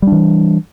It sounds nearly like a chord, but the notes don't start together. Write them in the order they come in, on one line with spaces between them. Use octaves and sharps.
G3 D4 E3